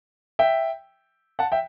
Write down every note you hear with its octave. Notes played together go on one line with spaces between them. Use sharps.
E5 G5
F#5 A5
E5 G5